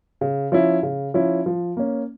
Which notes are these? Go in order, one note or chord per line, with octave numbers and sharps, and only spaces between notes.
C#3
F3 C#4 E4
C#3
F3 C#4 E4
F3
A#3 C#4